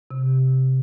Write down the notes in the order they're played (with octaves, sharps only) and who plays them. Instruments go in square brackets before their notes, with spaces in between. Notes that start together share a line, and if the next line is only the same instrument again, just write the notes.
[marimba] C3